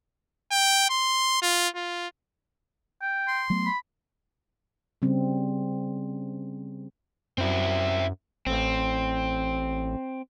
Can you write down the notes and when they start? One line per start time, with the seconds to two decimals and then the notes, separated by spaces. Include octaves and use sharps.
0.51 G5
0.90 C6
1.42 F4
1.76 F4
3.02 G5
3.28 C6
3.50 F#3 A3 B3
3.66 B5
5.02 C#3 G3 C4 C#4
7.38 F#2 C4 E4
8.47 A1 C4